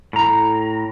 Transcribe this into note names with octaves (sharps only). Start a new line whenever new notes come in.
A2 A#5